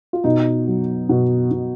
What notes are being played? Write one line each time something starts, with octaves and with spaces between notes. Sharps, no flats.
F4
B2 D#4
F#3
B2
B2